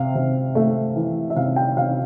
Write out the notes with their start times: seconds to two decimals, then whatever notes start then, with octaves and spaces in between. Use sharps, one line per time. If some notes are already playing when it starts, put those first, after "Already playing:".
Already playing: C3 F5
0.15 C3
0.55 A3
0.96 E3
1.30 E5
1.36 C3 F5
1.56 G5
1.77 C3 F5